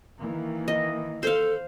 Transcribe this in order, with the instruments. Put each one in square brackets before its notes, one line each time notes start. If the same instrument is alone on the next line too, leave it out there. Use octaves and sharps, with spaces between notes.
[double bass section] D#3 E3 A#3
[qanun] D#5
[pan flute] A4 [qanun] C5 F5